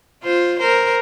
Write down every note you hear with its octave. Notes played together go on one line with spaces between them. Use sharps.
F4 C5
A#4 C5